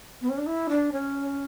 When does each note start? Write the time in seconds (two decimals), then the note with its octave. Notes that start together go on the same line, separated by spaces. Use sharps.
0.21 B3
0.29 C#4
0.38 D4
0.46 E4
0.69 D4
0.92 C#4